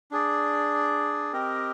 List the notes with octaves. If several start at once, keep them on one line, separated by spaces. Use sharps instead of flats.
D4 G#4 D5
C4 G4 A#4 D#5